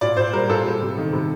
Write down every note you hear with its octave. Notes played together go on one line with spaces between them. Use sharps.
A#2 D5
A#2 C5
G3 A#4
A#2 A4
G3
C3
D#3
C3